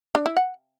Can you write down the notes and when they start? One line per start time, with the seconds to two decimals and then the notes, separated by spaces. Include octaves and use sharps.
0.15 D4
0.26 E4
0.37 F#5